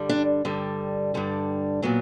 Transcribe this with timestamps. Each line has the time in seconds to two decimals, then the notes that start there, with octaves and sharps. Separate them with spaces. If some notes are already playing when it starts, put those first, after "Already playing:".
Already playing: G2 D3 G3
0.09 D4
0.45 G2 D3 G3
1.14 G2 D3 G3
1.82 A#2 F#3 B3